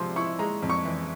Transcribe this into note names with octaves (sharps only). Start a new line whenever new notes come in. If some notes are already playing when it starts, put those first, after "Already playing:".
Already playing: C3 F3 G#3 C6
E4 C#6
G#3 A#5
F2
C#6
E3